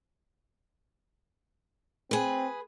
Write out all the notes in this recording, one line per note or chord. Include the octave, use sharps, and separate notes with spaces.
C4 G#4 B4